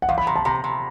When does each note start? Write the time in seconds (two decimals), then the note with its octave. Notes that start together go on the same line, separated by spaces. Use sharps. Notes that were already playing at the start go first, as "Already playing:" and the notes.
0.02 F#5
0.09 E2 F5
0.18 B5
0.27 C3 A#5
0.36 A5
0.45 C3 A#5
0.64 C3